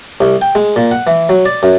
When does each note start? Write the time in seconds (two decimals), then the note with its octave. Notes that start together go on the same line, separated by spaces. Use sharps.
0.21 C2
0.41 G5
0.55 G#3
0.76 A#2
0.91 F#5
1.07 E3
1.29 F#3
1.45 D5
1.63 F#2